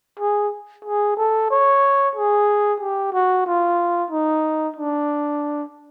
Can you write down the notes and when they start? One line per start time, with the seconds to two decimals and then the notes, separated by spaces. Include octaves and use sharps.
0.19 G#4
0.85 G#4
1.17 A4
1.51 C#5
2.16 G#4
2.80 G4
3.13 F#4
3.46 F4
4.11 D#4
4.77 D4